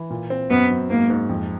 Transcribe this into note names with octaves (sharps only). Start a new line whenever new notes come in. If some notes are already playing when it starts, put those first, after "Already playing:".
Already playing: E3
A#2
C4
F#2 B3
F#2
G#2 A#3
G#2
F2